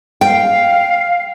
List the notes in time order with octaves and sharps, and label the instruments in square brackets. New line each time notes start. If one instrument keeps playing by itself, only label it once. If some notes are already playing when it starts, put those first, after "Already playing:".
[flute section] F5 [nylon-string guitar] G5